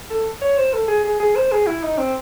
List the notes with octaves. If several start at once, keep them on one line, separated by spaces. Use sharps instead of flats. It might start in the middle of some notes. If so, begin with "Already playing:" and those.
A4
C#5
C5
A4
G#4
G#4
G#4
C5
G#4
E4
D#4
C4